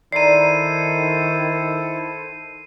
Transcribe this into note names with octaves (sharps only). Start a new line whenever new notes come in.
D#3 E4 A4 C5 D5 A#5 C7 D#7